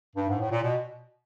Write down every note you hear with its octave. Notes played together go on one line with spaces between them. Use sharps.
G2
G#2
A2
A#2
B2